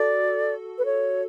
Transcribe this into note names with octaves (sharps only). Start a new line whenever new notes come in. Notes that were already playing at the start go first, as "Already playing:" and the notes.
Already playing: F#4 A4 D5
B4
C#5